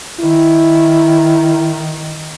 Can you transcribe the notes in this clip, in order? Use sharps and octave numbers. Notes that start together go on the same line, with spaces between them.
D#3 E4